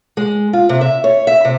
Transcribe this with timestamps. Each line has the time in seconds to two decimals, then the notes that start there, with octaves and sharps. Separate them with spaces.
0.17 G#3
0.53 F4
0.69 C3
0.81 E5
1.04 C#5
1.27 E5
1.45 C3